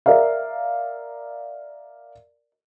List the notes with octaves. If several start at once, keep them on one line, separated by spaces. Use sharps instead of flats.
A#4 D5 E5 F5